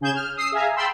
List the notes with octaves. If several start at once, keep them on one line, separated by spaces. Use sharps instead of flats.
C#3 G#4 G6 G#6 E7
F6
D#6 E6 C7
G#4 E5 F5 G#5 A#5
G5 A5 B5 C6 E6